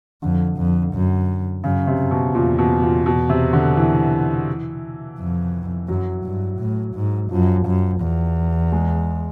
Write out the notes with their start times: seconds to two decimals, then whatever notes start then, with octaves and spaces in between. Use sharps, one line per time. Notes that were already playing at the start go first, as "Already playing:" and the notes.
0.22 F2 D3
0.57 F2
0.94 F#2
1.64 F#2 C#3
1.87 C3
1.99 F#2
2.11 B2
2.35 E2 A#2
2.58 B2
2.82 A#2
3.06 B2
3.29 C3
3.53 D3
3.77 E3
5.19 F2
5.88 F#2 F#3
6.25 G2
6.59 A2
6.95 G#2
7.31 F#2 F3
7.66 F#2
8.01 E2
8.72 G#3